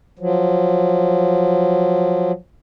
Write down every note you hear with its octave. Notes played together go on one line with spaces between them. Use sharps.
F3 F#3